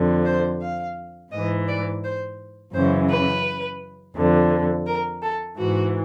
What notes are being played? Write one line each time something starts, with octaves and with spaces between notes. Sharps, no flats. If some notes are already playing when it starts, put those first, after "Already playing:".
Already playing: F2 D3
C5
F5
G#2 E3 D#5
D5
C5
F#2 C#3 E3 C5
B4
F2 D3
A#4
A4
G#2 E3 F#4